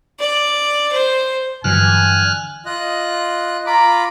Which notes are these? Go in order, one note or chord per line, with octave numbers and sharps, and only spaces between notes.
D5
C5
G2 D3 E3 F#3 G#5 F6 F#6
F4 D#5 F#6
F4 A#5 B5 D6